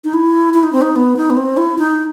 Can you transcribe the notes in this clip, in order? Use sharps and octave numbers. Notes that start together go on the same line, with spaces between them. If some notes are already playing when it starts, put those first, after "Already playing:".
D#4
E4
E4
D#4
C4
D#4
B3
D#4
B3
C4
E4
D#4